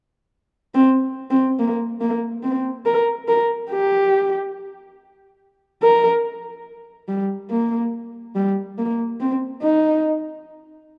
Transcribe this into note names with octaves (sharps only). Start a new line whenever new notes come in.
C4
C4
A#3
A#3
C4
A#4
A#4
G4
A#4
G3
A#3
G3
A#3
C4
D#4